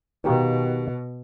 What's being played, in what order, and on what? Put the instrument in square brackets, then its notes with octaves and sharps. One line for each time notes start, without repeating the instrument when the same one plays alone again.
[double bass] B2 [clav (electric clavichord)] D#3 G4 F5